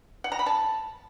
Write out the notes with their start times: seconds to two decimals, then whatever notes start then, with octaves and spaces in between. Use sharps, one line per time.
0.24 F#5
0.32 A#5
0.39 B5
0.46 A5